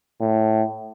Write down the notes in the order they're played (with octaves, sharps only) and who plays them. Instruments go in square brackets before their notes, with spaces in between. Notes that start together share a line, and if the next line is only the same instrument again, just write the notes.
[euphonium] A2